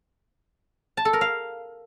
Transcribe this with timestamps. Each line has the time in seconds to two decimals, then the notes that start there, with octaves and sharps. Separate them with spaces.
0.97 A5
1.05 A4
1.13 A#4
1.21 F5